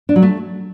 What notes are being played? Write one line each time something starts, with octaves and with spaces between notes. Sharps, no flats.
D4
F#3
A3